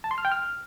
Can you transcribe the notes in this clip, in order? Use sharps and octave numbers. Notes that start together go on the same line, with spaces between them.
A5
C6
F6
G5
F6